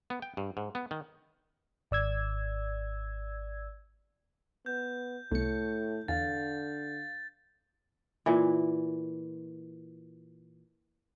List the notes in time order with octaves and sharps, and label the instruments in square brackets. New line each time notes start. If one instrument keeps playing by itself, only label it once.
[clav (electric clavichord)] B3
G5
G2
G#2
B3
D#3
[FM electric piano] G#1 D5 E6 G#6
[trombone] B3 [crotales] G6
[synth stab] C2 C#7 [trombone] A2 [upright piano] A3
[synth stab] E2 [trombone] D3 [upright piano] F5 [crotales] A6
[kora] A#2 E3